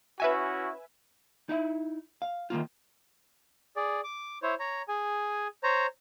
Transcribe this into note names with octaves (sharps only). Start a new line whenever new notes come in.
C#4 E4 F#4 B4 E5 G#5
D#4 E4 E5
F5
D#3 E3 A#3 F4
G#4 D5
D6
E4 C5 C#5
C#5 A#5
G#4 G#5
C5 C#5 A#5